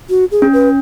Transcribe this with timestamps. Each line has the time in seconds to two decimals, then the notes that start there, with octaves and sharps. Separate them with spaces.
0.10 F#4
0.31 G#4
0.42 C#4
0.53 B4